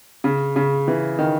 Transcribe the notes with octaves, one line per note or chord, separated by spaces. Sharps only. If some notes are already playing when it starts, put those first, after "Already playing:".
C#3
C#3
E3
D#3